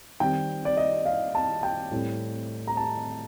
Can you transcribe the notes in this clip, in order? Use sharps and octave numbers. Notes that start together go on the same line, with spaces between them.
D#3 G3 C4 G5
D5
D#5
F5
A5
G5
A2 G3 C4
A#5
A5